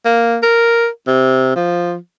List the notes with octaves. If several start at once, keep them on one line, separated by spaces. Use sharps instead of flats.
A#3
A#4
C3
F3